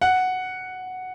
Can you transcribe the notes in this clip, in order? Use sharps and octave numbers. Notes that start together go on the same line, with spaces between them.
F#5